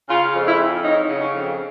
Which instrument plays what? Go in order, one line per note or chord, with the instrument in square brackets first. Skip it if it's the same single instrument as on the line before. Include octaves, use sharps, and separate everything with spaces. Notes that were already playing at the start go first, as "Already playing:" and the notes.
[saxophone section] C#3 F4
F2
E4
F2
F#3 D#4
C#3
C#4
F2